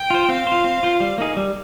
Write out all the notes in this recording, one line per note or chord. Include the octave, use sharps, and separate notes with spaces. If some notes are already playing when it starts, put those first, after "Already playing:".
Already playing: G5
F4 C5
C4 F5
F4 C5
C4
F4 C5
G3
A#3 D#4 G#4
G3